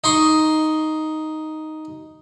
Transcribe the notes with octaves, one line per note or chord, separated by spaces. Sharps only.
D#4 C6 C#6